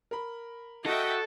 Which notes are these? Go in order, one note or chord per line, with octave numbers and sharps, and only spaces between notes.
A#4 B5
F#4 A4 D#5 E5 G5